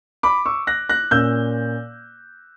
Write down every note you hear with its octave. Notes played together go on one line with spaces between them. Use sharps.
B5 D6
C#6 E6
F#6 A#6
F#6 A#6
A#2 A#3 C#4 E6 G6